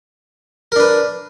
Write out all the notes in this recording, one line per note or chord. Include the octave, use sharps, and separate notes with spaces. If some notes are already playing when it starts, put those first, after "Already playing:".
D4 A#4 B4